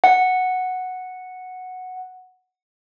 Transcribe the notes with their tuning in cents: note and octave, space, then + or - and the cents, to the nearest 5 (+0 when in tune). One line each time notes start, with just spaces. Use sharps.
F#5 -5